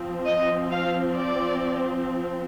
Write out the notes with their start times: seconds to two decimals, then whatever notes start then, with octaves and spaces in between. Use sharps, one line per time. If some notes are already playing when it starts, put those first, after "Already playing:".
Already playing: F3 C4
0.25 D#5
0.72 F5
1.16 D5